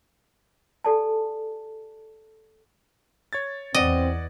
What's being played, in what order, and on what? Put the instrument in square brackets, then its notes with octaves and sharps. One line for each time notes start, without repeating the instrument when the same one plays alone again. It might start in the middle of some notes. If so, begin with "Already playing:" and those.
[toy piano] G4 A4 D5 G#5 A5
[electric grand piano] C#5 G#6 A6
[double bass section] E2 [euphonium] C4 [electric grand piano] D5 F#5 [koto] D#5